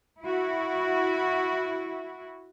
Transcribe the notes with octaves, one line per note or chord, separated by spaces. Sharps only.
E4 F#4